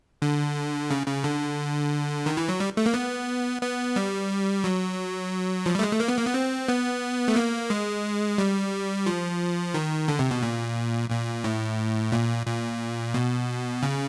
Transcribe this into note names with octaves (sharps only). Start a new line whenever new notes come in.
D3
C#3
C#3
D3
D#3
E3
F#3
G3
A3
A#3
B3
B3
G3
F#3
F3
G3
A3
G#3
A3
A#3
B3
A#3
B3
C4
B3
A3
A#3
G#3
G3
F3
D#3
D3
C3
B2
A#2
A#2
A2
A#2
A#2
B2
C#3